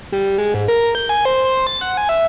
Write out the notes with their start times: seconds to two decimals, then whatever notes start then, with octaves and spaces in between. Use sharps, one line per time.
0.12 G3
0.38 G#3
0.54 G#2
0.68 A#4
0.95 G6
1.09 G#5
1.25 C5
1.45 C5
1.67 A6
1.81 F#5
1.97 G#5
2.09 E5